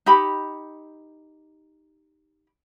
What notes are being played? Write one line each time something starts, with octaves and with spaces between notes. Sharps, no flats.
D#4 G4 B5